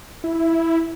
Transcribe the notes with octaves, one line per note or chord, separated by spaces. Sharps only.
E4